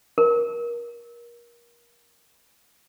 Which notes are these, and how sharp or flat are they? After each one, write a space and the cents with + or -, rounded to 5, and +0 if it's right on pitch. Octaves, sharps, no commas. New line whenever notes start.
A#4 +25